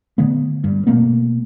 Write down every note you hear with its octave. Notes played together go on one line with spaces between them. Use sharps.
D3 A3 B3
G2
B2 A3 A#3 C4